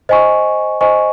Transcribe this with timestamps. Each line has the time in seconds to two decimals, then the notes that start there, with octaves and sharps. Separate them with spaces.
0.09 C5 D#5 G#5 C#6
0.81 C5 D#5 G#5 C#6